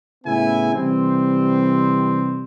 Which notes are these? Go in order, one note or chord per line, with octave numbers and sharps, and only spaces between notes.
A2 C#3 B3 E4 G#5
C3 E3 G3 C4